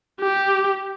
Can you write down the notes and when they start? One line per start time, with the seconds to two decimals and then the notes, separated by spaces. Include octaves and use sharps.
0.21 G4